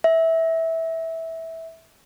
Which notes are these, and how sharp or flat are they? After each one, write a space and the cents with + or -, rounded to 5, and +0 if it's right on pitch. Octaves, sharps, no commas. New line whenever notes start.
E5 -15